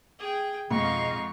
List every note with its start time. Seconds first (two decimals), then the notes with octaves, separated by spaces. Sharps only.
0.19 G#4 G5
0.71 F2 G#2 B2 D#5 F5 C#6